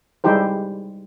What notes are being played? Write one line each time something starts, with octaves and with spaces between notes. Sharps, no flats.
G3 G#3 D#4 E4 G4 C5